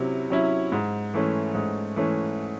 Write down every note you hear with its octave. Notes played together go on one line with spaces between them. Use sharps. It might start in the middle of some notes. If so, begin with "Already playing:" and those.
Already playing: C3 F#3 C#4 E4
F#3 C#4 E4
G#2
E3 A3 C#4
G#2
E3 A3 C#4